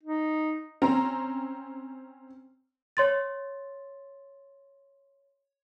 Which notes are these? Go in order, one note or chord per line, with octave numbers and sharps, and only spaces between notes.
D#4
C4 C#4 A#5
C#5 C6 A6